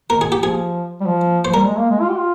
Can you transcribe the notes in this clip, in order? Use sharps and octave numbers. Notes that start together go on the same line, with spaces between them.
D#3 A#4
G#4
F3 G4
G#4
G3
F3
C5
F3
G3 A#4
G#3
A#3
G#3
F4
G4
F4